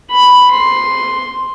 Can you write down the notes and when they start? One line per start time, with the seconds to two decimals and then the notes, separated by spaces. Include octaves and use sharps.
0.11 B5
0.51 C6